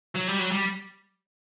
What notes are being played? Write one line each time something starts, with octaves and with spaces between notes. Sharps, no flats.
F#3
G3
F#3
G3